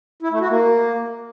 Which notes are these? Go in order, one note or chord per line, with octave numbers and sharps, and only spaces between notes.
E4
A3
F#4
A#3